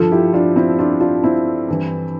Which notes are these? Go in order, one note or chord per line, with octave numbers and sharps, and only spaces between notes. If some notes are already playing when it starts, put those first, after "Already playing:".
Already playing: G2 F3 F4 A4
E4 G4
D4 F4
C4 E4
D4 F4
D4 F4
C4 E4
G2 E3